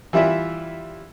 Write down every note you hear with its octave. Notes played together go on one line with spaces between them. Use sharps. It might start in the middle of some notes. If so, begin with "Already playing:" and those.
E3 G3 E4 F4 E5